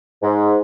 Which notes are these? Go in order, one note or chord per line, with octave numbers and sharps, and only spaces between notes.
G#2